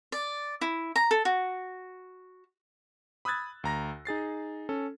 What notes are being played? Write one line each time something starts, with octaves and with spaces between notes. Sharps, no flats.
D5
E4
A#5
A4
F#4
B5 D#6 E6 F#6 G#6 A6
D2 A#5 A#6
D#4 G#4 A6 C7
C#4 A4